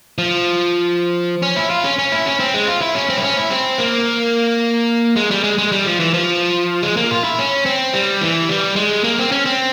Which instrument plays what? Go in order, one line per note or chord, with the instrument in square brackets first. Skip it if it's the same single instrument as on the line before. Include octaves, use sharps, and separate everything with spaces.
[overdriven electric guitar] F3
C#4
E4
F4
C#4
C#4
E4
C#4
C4
G#3
F4
E4
C#4
C4
E4
C#4
E4
C4
A#3
G#3
G3
G#3
G#3
G3
F3
E3
F3
G#3
A#3
F4
E4
C#4
C4
G3
E3
G3
G#3
A#3
C4
C#4
C4